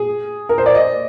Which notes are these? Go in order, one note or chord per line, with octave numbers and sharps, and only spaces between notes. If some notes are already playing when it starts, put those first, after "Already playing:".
Already playing: G#4
A#4
C5
D5
D#5